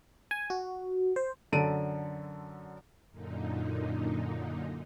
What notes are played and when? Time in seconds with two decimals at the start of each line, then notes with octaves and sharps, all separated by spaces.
0.31 G#5
0.50 F#4
1.16 C5
1.52 F#2 D3 A4 A5 D7 D#7
3.10 F#2 A#2 D3 D#4